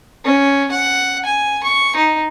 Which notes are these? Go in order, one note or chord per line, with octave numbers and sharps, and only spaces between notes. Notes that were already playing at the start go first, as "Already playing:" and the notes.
C#4
F#5
G#5
C#6
D#4